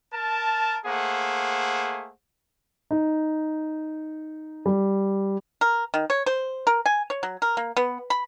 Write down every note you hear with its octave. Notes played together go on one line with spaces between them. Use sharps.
A#4 A5
A3 A#3 G#4 C5 F#5
D#4
G3
A#4
D#3
C#5
C5
A#4
G#5
C#5
F#3
A#4
A#3
B3
B5